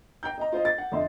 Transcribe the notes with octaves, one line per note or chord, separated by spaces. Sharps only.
G5 A#5 G6
D#5 A#5
F4 C5 D#5
A6
F#5
F2 D3 D#5 E5 C6